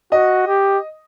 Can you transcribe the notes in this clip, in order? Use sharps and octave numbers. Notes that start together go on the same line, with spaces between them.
F#4 D#5
G4